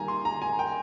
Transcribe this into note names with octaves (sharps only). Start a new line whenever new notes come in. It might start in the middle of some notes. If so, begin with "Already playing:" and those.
Already playing: D#3 G3 A#3 G#5 A#5
C6
A#5
G#5
G5